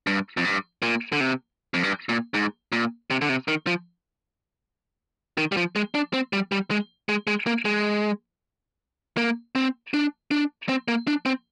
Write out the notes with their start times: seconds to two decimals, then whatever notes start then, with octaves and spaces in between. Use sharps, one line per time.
0.07 G2
0.37 F2
0.45 G2
0.82 A#2
1.12 D3
1.20 C3
1.74 F2
1.83 G2
2.09 A#2
2.34 G#2
2.72 A#2
3.10 C3
3.21 D3
3.29 C3
3.48 D#3
3.67 F3
5.38 D#3
5.52 G3
5.57 F3
5.76 G#3
5.94 D4
6.14 C4
6.33 G3
6.52 G3
6.71 G#3
7.09 G#3
7.27 G#3
7.47 A#3
7.65 G#3
9.17 A#3
9.55 C4
9.94 D4
10.31 D4
10.69 C4
10.88 A#3
11.07 D4
11.26 C4